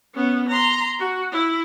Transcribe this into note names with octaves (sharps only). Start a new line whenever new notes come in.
B3 C#4
A#5 C6
F#4
E4